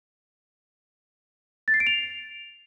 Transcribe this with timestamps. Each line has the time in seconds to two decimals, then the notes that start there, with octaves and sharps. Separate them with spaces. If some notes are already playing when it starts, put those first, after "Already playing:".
1.68 A6
1.74 C7
1.80 D7
1.87 F7